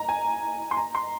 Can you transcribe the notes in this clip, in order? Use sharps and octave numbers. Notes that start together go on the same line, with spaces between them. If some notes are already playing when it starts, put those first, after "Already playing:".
Already playing: A#5
G#5
C6
A#5
C6